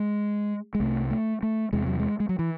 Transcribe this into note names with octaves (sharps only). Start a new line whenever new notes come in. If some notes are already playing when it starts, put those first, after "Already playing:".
Already playing: G#3
G#3
C2 C3 A3
A3
A3
E2 C3 G#3
F#3
G#3
G#3
F#3
E3